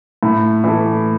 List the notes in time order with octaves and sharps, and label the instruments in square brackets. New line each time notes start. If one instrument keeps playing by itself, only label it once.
[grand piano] A2
E3 A3